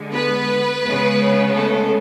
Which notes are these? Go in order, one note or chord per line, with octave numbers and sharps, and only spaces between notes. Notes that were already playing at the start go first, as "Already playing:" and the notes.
Already playing: D3 G#3
B3 B4
C#3 G#3 B3
A3 A4